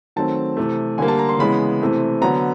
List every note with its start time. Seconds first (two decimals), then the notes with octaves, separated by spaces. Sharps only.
0.16 D#3 F#3 A3 C4 A5
0.57 C3 E3 A3
0.98 D3 G3 A#3 G#5
1.08 A5
1.19 A#5
1.29 C6
1.39 C#3 E3 G#3 B3 B5
1.81 C3 E3 A3 C4
2.22 D3 F#3 B3 A#5